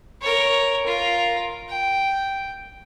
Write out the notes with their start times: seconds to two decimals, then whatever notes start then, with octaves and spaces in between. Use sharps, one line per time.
0.21 A#4 C#5
0.86 F4 A#4
1.69 G5